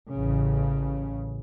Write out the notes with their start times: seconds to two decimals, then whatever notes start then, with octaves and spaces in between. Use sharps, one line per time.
0.11 A1 C#3